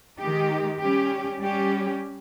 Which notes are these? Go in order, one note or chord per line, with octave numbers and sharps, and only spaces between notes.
D#3 G#3 D#4 G4
G3 C#4 G4
G3 C#4 G4